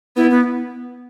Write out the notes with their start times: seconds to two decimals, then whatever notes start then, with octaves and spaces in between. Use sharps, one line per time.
0.16 B3 E4
0.31 B3